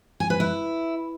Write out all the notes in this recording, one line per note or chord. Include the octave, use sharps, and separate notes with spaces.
G#5
B4
E4